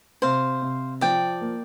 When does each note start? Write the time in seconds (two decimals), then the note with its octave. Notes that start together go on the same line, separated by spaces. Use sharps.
0.22 C3 C5 F5
0.62 C3
1.01 F3 D5 G5
1.41 A#3